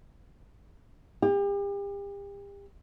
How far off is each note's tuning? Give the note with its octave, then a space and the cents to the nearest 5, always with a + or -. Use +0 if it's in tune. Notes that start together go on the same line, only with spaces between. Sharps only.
G4 +40